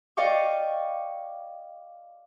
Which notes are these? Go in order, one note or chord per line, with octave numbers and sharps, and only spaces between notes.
D5 D#5 F5 G5 C#6 D6